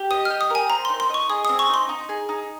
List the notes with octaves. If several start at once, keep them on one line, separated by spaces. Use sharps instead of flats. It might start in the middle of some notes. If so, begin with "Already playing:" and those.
Already playing: G4
D#5 D#6
G4 F6
D#6
A#4 G#5
C4 A#5
D#4 C6
C6
D#5 C#6
G#4 D#6
C4 D#6
C#6
D#4 C6
D#4
G#4
D#4